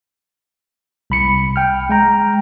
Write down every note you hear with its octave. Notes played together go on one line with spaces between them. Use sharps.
C2 B5 C#7
G5 F6
G#3 G5 A#5